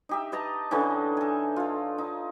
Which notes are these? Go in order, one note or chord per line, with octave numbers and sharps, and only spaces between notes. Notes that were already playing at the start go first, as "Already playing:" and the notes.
D#4 G4 E5
B4 D#5 A5 A#5
D3 E3 C#4 D#4
A4 G#5
F4 A4
D#4